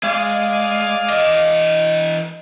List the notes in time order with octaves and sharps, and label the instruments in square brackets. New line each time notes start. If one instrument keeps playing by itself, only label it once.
[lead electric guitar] G#3 [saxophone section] G#4 D5 F5
[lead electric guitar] E3 D#5